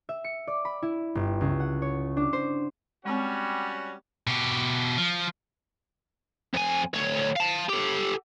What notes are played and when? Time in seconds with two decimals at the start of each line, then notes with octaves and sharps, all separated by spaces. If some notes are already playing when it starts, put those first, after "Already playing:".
0.09 E5
0.24 C#7
0.47 D5
0.65 B5
0.82 E4
1.15 G1
1.41 C#2
1.60 F#5
1.82 C#5
2.17 D4
2.33 C5
3.05 G3 G#3 C4 C#4 F#4
4.27 B2 G4
4.98 F3
6.54 F2 G#5
6.94 D2 C#5
7.36 F5 A5
7.69 G4 A4